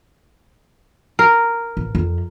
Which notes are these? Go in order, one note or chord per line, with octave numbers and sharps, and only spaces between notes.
A#4
A1
F2